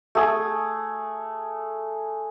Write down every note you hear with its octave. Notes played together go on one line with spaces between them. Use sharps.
A3 G#4